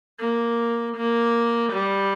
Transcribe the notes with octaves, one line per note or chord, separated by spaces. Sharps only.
A#3
A#3
G3